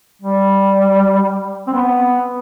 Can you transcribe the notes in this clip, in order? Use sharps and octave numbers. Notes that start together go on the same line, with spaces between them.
G3
C4
B3